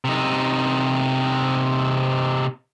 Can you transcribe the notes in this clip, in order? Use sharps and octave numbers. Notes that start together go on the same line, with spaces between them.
C3 D#4